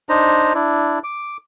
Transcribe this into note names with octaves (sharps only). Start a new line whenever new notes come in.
D4 D#4 C5 A#5
D4 E4
D6